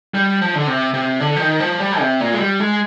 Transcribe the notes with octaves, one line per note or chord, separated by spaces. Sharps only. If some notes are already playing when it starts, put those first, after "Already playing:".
G3
F3
D3
C3
C3
D3
F3
D#3
F3
G3
C3
A#2
G#3
G3
G#3